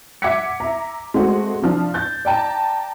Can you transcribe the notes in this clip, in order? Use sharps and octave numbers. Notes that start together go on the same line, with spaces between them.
E5 F#5 D6 G#6 B6 C#7
E5 A#5
G#3 A3 C4 F#4
C3 F3 D4
G6 A6
D5 G5 A5 A#5